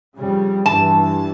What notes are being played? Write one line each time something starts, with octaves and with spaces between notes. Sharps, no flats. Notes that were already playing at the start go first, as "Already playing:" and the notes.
F2 C#3 G3
G2 E3 A5